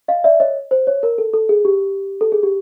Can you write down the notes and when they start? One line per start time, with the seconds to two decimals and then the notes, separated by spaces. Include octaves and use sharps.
0.08 D#5 F5
0.24 D5 E5
0.40 C#5 D#5
0.71 C5
0.87 C#5
1.03 A#4
1.18 A4
1.34 A4
1.49 G#4
1.65 G4
2.21 A4
2.32 G#4
2.43 G4